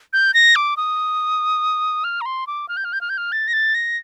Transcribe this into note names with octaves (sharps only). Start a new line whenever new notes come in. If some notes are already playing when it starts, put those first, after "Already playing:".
G6
A#6
D6
D#6
F6
A#5
C6
D6
F6
G6
F6
G6
F6
G6
F6
A6
A#6
A6
A#6